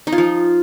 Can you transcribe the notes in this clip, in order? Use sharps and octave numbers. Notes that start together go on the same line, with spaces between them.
D#4
F4
F3